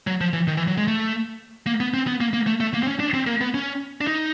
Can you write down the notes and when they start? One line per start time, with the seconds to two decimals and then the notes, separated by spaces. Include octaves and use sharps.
0.07 F#3
0.21 F3
0.33 E3
0.48 D#3
0.57 E3
0.68 F#3
0.78 G#3
0.88 A3
1.67 A#3
1.80 B3
1.94 C4
2.07 B3
2.21 A#3
2.34 A#3
2.47 A3
2.60 A3
2.74 A#3
2.83 C4
2.87 C#4
3.00 D4
3.14 C4
3.27 A#3
3.41 B3
3.54 C#4
4.01 D4
4.07 D#4